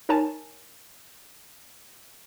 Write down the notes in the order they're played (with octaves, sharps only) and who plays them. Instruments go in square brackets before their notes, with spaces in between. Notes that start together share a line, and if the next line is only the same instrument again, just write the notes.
[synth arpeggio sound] D#4 A#4 C#5 G#5 A5